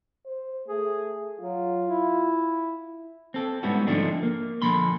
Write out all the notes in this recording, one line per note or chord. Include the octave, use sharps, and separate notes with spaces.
C5
A3 G#4
F#3 F4
E4
C4 A4
G#2 G3 B3 C#4 E4 F#4
D3 F3 A3 C4 D4 D#4
A#3
A#2 D3 F3 B5 C6